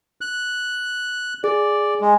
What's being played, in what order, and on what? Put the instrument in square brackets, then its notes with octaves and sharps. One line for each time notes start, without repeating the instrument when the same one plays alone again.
[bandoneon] F#6
[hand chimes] G#4 [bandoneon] D5
[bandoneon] G#3